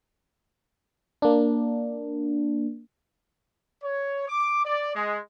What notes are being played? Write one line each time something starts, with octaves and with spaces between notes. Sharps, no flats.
A#3 D4
C#5
D6
D5
G#3